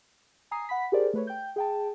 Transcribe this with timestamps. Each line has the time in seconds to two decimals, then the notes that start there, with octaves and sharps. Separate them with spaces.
0.51 G#5 A#5 D#6 C7
0.69 F#5 B5 B6
0.92 G4 G#4 A#4 C5 D5
1.14 A3 B4 C#5
1.27 G5 G6
1.56 G#4 G5 A5